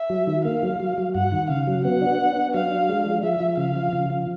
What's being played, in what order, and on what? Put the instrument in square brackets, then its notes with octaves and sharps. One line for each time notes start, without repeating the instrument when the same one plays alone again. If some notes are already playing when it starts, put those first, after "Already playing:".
Already playing: [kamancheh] E5
[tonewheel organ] F#3
D#3
[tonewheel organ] A#3 [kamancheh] F5
[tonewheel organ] F#3
F#3
F#3
[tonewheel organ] G2 [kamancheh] F#5
[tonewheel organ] D#3
[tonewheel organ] C#3 [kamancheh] F5
[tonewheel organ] F#3
[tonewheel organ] B3 [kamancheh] F#5
[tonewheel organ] D4
B3
D4
[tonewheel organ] F#3 [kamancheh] F5
[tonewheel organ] D4
G#3
F3
[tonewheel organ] F3 [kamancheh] E5
[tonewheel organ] F3
[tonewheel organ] C#3 [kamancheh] F5
[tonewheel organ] F3
C#3
F3